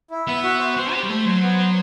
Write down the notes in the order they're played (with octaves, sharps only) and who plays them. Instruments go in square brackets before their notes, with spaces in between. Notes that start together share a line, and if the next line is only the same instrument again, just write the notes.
[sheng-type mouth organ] E4
[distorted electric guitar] B3 [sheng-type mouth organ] E5
[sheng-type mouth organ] F#4
C5
[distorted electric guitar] C4 [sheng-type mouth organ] C5
[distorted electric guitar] G4 [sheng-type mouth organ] C5
[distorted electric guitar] G3
[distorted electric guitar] A3 [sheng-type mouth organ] C5
[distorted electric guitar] F#3 [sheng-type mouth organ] C5
[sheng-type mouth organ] B3
C5